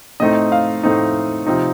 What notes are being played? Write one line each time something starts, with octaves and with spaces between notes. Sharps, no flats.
A2 A3 C4 D#4 D#5
F5
A2 A3 C4 D#4
C3 F3 C4 D#4